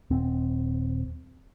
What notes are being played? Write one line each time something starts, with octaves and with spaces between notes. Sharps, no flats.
D#1 C4